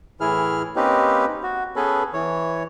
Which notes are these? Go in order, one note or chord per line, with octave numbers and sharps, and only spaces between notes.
A2 E3 E4 G#4 F6
A#3 C4 C#4 D#4 G4 B4
F#4
B3 C#4 G#4 A4 B4
E3 C#5